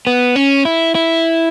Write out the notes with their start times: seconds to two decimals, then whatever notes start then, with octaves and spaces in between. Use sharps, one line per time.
0.07 B3
0.36 C#4
0.65 E4
0.95 E4